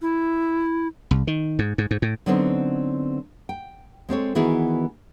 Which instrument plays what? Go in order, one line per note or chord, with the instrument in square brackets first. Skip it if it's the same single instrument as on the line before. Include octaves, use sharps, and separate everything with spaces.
[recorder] E4
[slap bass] C2
D#3
G#2
G#2
G#2
A2
[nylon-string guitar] D3 F#3 B3 C4 D4 D#4
G5
G#3 C4 A4 C#5
D#3 E3 B3 E4 F#4 G#4